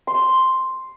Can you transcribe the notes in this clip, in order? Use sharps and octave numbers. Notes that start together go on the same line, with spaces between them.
C6